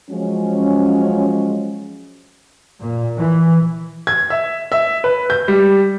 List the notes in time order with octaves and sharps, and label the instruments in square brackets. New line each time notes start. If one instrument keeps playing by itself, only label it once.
[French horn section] F3 F#3 G#3 C#4
[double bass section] A#2
E3
[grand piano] G#6
E5
E5
B4
G6
G3